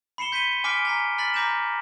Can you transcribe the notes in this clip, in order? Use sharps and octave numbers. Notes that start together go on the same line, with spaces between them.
B5 C7 C#7 E7 G7
C6 G6 B6 C#7 D#7 G7
G#5 D6 F6 B6 D7
G#5 A#5 B6
B5 F6 A6 B6 F#7
A#5 B5 D6 G6 A#6 E7